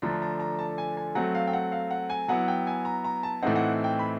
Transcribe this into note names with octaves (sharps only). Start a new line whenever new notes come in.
D3 F3 A3 D4 A#5
A#5
A#5
A5
G#5
G#5
F#3 A3 C4 F#5
F5
G5
F#5
F5
F#5
G#5
F#3 B3 E4 F#5
G5
G#5
A#5
A#5
A5
A2 E3 A3 C4 D#4 F#5
F#5
G5
B5